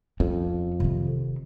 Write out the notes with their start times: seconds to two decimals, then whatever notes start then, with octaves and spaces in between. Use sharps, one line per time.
0.20 F2 C#4
0.80 C3 D#3